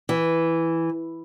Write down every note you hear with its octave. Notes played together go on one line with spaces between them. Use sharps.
E3